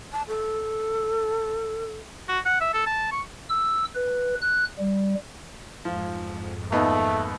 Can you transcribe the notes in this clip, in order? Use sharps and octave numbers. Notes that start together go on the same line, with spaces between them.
A5
A4
F#4
F#5
E5
A4
A5
C#6
E6
B4
F#6
G3
F2 G#2 F3
D#2 A3 B3 D#4